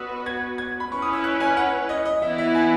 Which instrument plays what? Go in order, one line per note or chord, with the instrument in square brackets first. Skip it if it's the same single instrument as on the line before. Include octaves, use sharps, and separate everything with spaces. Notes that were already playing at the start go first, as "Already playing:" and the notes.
Already playing: [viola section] B3 F#4 B4 [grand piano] D#6 E6
[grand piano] G#6
G#6
B5
[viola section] C#4 E4 B4 [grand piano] C#6
[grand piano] D#6
E6
F#6
G#5
F#5
D#5
D#5
[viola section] E3 B3 E4 B4 [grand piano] E5
[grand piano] E5
G#5